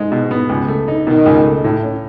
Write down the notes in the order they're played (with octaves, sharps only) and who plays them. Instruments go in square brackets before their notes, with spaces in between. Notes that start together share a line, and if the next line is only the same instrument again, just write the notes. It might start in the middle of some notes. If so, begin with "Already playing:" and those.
Already playing: [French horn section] G#2 [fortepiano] G#3 D#4
[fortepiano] B2
B3
C#2
A3
D#4
[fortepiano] B2 [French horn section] D#3
[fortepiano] C#2
A3
A2
C#4